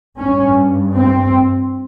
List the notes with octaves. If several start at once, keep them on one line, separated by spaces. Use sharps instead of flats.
G2 C#4
C4